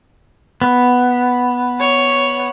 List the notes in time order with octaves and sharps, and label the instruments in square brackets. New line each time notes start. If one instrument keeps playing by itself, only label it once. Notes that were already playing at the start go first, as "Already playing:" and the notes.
[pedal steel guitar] B3
[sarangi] C#5